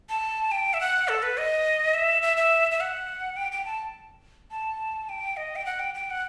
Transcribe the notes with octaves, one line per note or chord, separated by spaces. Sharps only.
A5
G5
E5
F#5
A4
B4
D#5
E5
E5
E5
E5
F#5
G5
G5
A5
A5
G5
D#5
G5
F#5
G5
G5
F#5